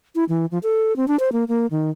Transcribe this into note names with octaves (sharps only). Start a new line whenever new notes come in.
E4
E3
F3
A4
C4
D4
C5
A#3
A#3
D#3